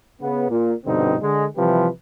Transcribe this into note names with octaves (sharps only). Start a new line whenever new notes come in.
C#3 B3
A#2
A#1 G2 B2 D3 C4 D#4
D3 G#3
C3 E3 F3 G3 G4 B4